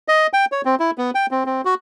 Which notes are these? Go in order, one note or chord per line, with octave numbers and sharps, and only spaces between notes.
D#5
G5
C#5
C4
E4
B3
G5
C4
C4
F#4